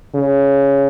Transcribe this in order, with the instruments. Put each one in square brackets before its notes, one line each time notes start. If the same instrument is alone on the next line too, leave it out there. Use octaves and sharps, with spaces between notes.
[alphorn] C#3